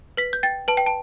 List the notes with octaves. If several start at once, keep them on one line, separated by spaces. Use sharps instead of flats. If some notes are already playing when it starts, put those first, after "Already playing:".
B4 B6
G6
G5 A6
B4 A5
G5
A5